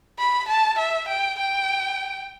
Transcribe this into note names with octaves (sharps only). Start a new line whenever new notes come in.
B5
A5
E5
G5
G5